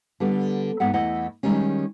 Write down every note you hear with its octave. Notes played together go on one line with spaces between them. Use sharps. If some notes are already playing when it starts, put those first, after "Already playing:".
D3 G3 B3
G#2 B3 E5 F#5
E2 A3 E4 D#5 F#5
D#3 G3 G#3 C#4